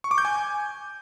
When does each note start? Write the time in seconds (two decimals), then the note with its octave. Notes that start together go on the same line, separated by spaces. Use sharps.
0.04 C#6
0.11 D6
0.18 G6
0.25 G#5